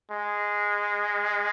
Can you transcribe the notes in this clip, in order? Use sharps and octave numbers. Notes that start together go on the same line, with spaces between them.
G#3